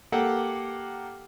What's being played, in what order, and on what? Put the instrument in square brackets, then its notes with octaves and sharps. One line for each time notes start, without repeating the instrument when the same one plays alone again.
[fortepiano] A#3 G4 A4 F#5 G5